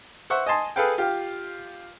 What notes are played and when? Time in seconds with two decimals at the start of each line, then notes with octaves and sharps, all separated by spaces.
0.30 C5 E5 F#5 C#6
0.46 D#5 G#5 A5 C6
0.76 G#4 A4 B4 F5 G5
0.98 F4 G4